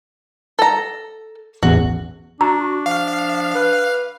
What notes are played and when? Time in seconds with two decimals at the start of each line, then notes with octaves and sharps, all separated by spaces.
0.59 A4 A#5
1.63 A1 E2 F#4
2.41 D4 F#4 A#5
2.61 F#4
2.86 F3 F5
3.55 B4